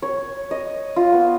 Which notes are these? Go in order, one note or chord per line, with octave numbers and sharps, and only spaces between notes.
C#5
D#5
F4
B3